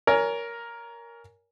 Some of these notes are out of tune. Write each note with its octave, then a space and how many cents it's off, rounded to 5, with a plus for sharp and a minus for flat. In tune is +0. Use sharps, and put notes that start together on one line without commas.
A#4 +5 C#5 +30 G#5 +0